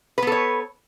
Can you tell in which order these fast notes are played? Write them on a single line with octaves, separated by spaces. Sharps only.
B4 B3 A4 C#5